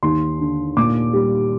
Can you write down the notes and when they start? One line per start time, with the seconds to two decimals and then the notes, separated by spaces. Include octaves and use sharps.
0.03 D#2 C6
0.40 D3
0.77 A#2 D6
1.14 G3